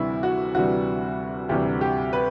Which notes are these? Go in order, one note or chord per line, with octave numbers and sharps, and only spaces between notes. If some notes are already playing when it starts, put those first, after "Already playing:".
Already playing: D2 C3 E3 G3 E4
F#4
D2 C3 E3 G3 F#4
D2 C3 E3 G3 G4
G4
B4